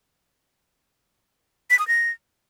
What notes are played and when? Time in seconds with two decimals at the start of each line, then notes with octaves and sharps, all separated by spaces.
1.70 B6
1.79 D#6
1.88 A#6